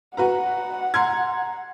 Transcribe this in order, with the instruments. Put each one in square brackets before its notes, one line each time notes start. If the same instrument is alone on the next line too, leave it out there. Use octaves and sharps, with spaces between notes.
[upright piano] F#4 B4 A#5 [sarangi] F#5
[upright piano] A#5 C6 G#6